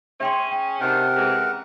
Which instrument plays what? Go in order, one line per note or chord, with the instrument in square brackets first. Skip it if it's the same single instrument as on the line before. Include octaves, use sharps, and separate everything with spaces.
[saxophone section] C#4 G#4 [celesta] E5 G5 C6
[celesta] G5
[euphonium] C3 [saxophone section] D#3 D4 [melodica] A#4 F#5
[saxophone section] C#3 E3 G#3